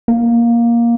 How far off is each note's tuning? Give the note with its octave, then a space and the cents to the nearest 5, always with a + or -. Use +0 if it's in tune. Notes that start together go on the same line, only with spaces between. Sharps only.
A#3 +10